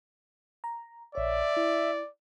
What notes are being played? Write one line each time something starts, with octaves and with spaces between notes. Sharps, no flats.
A#5
A#1 C#5 D5 E5
E4